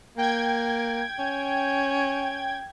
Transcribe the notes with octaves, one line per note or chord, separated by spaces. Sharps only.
A#3 G5 G#6
C#4